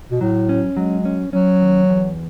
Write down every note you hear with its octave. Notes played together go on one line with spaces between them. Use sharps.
B2
A2 F#3
C#4
F#3 G#3
C#4
F#3 C#4
D#2
E2